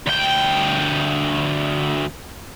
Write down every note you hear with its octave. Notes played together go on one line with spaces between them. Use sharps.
D2 G5